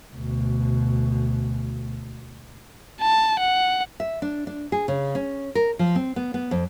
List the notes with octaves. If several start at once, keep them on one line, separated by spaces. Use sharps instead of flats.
D2 B2
A5
F#5
E5
D4
D4
G#4
C#3
C#4
A#4
F3
C4
B3
B3
F2